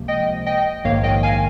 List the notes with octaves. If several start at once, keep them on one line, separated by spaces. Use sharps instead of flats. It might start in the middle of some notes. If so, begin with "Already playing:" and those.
Already playing: C#2 C3 F3 A#3
D#5 G5
D#5 G5
A#1 G#2 D#3 A#3 C#5 F5
D#5 G5
F5 G#5